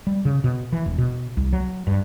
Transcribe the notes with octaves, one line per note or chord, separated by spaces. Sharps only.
G3
C#3
B2
E3
E1
B2
C2
F#3
G2